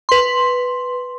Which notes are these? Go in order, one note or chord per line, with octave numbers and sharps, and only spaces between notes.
B4 C6